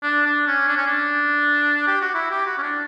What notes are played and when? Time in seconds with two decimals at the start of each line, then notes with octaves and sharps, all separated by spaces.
0.04 D4
0.26 D4
0.48 C#4
0.68 D4
0.77 C#4
0.87 D4
1.88 G4
2.02 F#4
2.14 E4
2.31 G4
2.46 F#4
2.58 C#4
2.63 D4